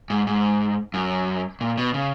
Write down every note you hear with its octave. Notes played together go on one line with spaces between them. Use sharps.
G#2
G#2
F#2
A#2
B2
C#3